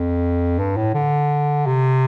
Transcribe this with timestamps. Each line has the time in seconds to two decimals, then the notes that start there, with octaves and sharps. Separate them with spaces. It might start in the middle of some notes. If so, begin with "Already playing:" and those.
Already playing: F2
0.59 G2
0.77 A2
0.94 D3
1.66 C3